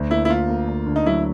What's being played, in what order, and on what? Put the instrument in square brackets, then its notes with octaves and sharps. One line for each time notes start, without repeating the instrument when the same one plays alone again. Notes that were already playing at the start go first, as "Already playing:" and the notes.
Already playing: [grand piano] D2
[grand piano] A#3 [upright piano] E4
[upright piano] E4
[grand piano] A#3 [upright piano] F4
[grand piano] A#3
D2
D3
[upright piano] D#4
[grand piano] F#3 [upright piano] E4